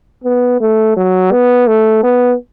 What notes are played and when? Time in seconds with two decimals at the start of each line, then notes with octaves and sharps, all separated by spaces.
0.24 B3
0.61 A3
0.96 F#3
1.32 B3
1.67 A3
2.03 B3